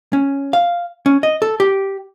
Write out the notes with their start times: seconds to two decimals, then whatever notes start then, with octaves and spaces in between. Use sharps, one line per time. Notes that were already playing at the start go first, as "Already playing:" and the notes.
0.13 C#4
0.53 F5
1.06 C#4
1.23 D#5
1.42 A4
1.60 G4